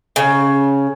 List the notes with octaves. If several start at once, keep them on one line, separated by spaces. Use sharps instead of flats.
C#3